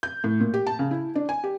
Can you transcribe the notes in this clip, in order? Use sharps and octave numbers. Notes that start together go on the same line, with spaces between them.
G6
A2
A#2
G4
A5
C#3
E4
D4
G#5
G4